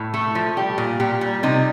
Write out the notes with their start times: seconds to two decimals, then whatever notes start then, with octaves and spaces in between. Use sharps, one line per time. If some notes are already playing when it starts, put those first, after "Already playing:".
Already playing: A2
0.14 A3 A4
0.35 F3
0.57 G3 G4
0.78 A#2
1.00 A#2 G4
1.21 G3
1.43 C3 D#4